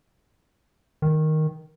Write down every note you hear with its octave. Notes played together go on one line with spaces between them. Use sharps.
D#3